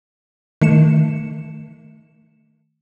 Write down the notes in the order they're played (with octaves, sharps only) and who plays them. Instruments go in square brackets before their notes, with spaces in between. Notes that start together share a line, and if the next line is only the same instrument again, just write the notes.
[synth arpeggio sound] D#3 A3 C#7 E7